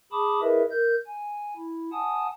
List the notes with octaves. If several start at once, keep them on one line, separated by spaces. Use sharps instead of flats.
G#4 A5 B5 D6 D#6
E4 G#4 A#4 B4 D#5 E5
A#4 G6
G#5
E4
F#5 G#5 A5 D#6